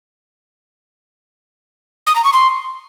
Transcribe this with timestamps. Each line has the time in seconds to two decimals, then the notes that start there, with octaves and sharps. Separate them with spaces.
2.07 D#6
2.16 A#5
2.24 C#6
2.33 C6